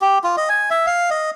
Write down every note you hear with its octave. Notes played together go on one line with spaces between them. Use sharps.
G4
F4
D#5
G#5
E5
F5
D#5